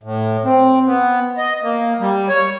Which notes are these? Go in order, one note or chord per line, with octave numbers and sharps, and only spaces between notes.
A2
C4
B3
D#5
A#3
G3
C#5